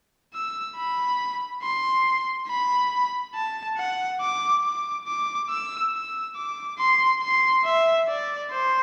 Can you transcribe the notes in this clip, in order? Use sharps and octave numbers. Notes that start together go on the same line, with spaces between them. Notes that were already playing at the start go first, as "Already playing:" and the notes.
E6
B5
C6
B5
A5
F#5
D6
D6
D6
E6
E6
D6
C6
C6
E5
D5
C5